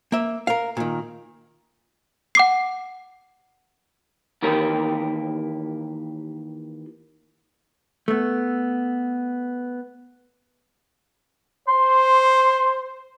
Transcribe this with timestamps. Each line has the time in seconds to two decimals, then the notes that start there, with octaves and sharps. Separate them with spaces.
0.12 A#3 E5
0.47 A#4 F5
0.77 A#2 D#3
2.35 F#5 D6 C7
4.42 D#3 E3 A#3 G4 A#4
8.08 A3 B3
11.68 C5 C6